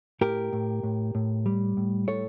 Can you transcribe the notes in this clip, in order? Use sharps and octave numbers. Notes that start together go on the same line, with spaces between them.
A2 G4 A#4
A2
A2
A2
G3
A2
A2 A4 C#5